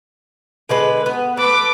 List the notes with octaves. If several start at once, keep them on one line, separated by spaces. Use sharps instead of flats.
D3 G#3 B4
B3
A4 B4 D6